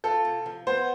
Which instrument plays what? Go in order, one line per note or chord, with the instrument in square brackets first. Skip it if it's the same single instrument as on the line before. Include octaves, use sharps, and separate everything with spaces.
[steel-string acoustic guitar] F4 [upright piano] A4
[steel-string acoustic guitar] C3
F3
[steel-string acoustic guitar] B3 [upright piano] C5